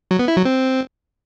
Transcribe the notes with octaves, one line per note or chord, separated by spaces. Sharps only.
F#3
B3
E4
F#3
C4